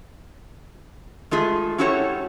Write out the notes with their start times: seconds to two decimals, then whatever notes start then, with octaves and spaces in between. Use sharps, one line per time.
1.31 G#3 A3 F4 G#4
1.78 C#4 E4 F#4 G4 A4 C#5